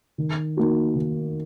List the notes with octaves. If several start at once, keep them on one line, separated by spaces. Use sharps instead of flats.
D#3
A#3 D#4 F#4
D#3